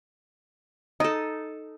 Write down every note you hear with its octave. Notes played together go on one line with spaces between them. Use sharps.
D#4 A4 D#5